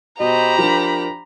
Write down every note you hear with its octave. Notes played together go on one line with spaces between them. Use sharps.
B2 G4 C5 D#5 A#5 B5
F3 D4 A#4